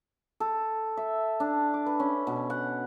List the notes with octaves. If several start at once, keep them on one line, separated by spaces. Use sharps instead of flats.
A4
E5
D4
D6
B4
C#4
B2
F#5